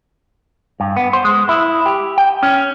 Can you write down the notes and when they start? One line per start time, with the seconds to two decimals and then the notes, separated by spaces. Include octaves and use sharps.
0.80 G2
0.97 B3
1.13 C5
1.25 G#3
1.49 E4
1.86 G4
2.18 G5
2.43 C#4